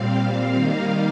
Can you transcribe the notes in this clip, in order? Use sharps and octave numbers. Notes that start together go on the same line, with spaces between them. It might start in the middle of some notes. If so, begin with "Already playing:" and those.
Already playing: A#2 G3 C4 F5
D#3 G3 A#3 D#4